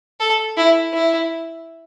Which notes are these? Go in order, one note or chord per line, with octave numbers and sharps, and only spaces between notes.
A4
E4
E4